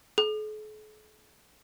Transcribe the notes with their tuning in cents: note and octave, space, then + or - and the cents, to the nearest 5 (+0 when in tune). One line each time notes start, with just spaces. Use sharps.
A4 -45